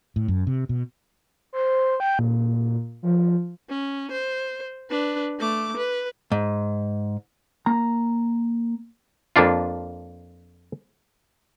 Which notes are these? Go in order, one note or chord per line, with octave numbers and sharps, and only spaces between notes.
A2
F#2
C3
B2
C5
G5
A#2
F3
C#4
C5
D4 B4
A3 D6
B4
G#2
A#3 A#5
F2 A#3 D4 F4